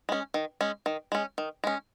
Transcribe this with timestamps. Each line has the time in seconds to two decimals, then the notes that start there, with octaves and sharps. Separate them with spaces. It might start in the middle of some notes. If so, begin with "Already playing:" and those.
0.09 G#3 C#4
0.34 D#3
0.61 G#3 C#4
0.86 D#3
1.12 G#3 C#4
1.38 D#3
1.64 G#3 C#4